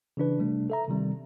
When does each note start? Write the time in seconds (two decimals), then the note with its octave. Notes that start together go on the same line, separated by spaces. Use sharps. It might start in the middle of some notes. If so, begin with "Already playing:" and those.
0.17 C#3 E3 D4 B4
0.39 C3 G3 A3 D4
0.70 A4 E5 A#5
0.88 C3 D#3 G3 C4